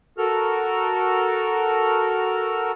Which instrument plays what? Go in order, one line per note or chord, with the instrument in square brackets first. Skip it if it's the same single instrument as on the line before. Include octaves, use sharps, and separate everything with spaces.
[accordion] F#4 A4 A#4 F6